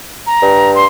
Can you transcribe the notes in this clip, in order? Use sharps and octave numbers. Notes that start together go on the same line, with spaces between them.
A#5
G2
C6